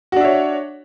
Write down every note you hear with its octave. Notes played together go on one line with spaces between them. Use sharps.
D4 F#4 C#5 E5